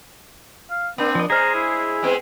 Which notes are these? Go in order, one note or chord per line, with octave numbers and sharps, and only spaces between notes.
F5
A#3 C4 D4
F3 D#5
G#3 G#4 C5 A#5 F6
E4
G#3 B3 C4